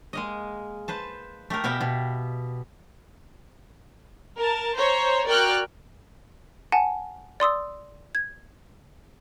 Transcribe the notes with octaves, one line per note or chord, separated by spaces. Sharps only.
G#3 A#3 D#5
B4 C5 A5
A3 G4 G#4 A#4
B2 B3 E5 F5 G5
B2
A#4 A5
C5 C#5 A#5
F#4 A#4 D5 G5 F6 F#6
F#5 G#5 A5
D5 C6 D#6 E6
G#6